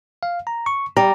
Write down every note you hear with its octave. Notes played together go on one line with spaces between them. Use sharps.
F5
A#5
C#6
G3 A#5